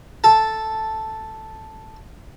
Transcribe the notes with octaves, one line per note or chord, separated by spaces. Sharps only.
A4 A5